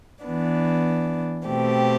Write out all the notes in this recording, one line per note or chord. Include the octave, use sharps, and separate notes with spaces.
E3 B3 D4
B2 A3 C4 G4